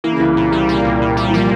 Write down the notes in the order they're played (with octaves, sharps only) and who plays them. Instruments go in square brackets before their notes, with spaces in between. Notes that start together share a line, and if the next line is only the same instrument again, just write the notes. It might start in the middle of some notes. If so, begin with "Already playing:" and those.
[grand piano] E3 [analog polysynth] A#3
[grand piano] C#3
[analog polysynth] C2 [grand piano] E3
[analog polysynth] A#2
G3
A#3
C2
A#2
G3
[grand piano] E3
[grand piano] F3 [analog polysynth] A#3